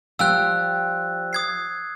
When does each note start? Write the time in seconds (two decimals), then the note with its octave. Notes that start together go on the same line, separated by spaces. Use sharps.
0.19 F3 G3 G5 E6 F#6
1.33 D#6 G#6 C7